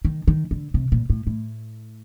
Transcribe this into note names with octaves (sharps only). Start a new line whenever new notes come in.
D#3
D#3
D3
C3
A#2
A2
A2